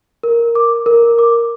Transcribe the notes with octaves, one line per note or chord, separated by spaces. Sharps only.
A#4
D6
A#4
D6